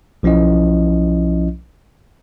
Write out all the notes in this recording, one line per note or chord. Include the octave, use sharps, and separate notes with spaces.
B1 F3 C#4 E4 D#5